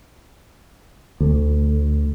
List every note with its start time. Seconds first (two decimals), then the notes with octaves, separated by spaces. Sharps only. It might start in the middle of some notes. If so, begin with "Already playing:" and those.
1.20 D2